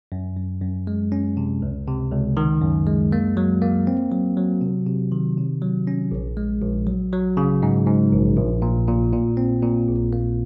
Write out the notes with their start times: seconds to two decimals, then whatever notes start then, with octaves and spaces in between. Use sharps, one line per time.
0.12 F#2
0.37 F#2
0.62 F#2
0.87 G#3
1.12 C#4
1.37 C3
1.62 C#2
1.87 C3
2.11 C#2
2.37 D#3
2.61 F#2
2.87 G#3
3.12 A#3
3.37 F#3
3.62 A#3
3.87 C4
4.12 F#3
4.37 F#3
4.61 C3
4.87 C3
5.12 D#3
5.37 C3
5.62 F#3
5.87 C#4
6.12 A#1
6.37 G#3
6.62 A#1
6.87 F#3
7.13 F#3
7.37 C#3
7.63 G#2
7.87 G#2
8.12 A#1
8.37 A#1
8.62 A#2
8.88 A#2
9.13 A#2
9.37 C4
9.63 A#2
9.87 A#1
10.13 A#3